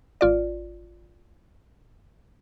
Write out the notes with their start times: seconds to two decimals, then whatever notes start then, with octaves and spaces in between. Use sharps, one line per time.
0.21 G#1 F4 D5